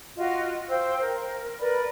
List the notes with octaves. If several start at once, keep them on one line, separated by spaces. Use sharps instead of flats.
F4 F#4 D#5
C5 F5 G5 E6
A#4
A#4 B4 D5 B5